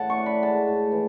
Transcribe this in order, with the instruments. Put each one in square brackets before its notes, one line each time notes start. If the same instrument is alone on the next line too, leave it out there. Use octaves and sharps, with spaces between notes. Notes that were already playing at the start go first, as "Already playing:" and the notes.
Already playing: [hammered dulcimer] A2 F#5 A5
C#6
D4
B5
G#3 A5
A2
E3